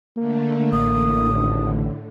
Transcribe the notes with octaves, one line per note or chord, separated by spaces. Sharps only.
D3 A3 A#3
A1 A2 D3 D#6
G#1